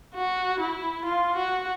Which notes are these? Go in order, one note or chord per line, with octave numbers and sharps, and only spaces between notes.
F#4
E4
F4
F#4